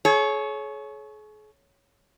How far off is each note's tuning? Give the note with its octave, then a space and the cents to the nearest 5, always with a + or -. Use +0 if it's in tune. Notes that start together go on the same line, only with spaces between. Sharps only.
G#4 +45 C#5 +0